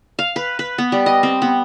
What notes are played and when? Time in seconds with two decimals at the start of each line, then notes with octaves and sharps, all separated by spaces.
0.19 F5
0.36 B4
0.59 B4
0.78 B3
0.92 G3
1.06 D#5
1.23 C4
1.42 B3